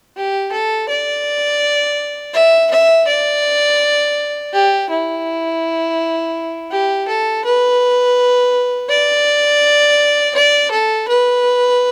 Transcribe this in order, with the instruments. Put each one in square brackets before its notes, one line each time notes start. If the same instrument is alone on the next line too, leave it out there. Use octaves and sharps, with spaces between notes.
[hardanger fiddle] G4
A4
D5
E5
E5
D5
G4
E4
G4
A4
B4
D5
D5
A4
B4